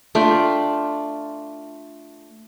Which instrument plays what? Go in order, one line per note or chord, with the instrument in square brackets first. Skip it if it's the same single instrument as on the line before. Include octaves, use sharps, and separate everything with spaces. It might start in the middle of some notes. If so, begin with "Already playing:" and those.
[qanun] A3 D4 F4 G5